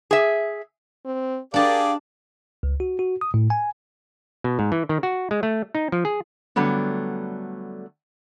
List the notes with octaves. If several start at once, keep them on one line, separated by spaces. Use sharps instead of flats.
G#4 E5
C4
D4 G4 G#4 A#4 D5 F5 A5
C#2
F#4
F#4
D#6
A2
G#5
B2
G#2
E3
D#3
F#4
G#3
A3
D#4
F3
G#4
D3 F#3 G3 A3 B3